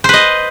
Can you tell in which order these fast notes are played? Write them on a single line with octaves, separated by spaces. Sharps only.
C5 B4 D#5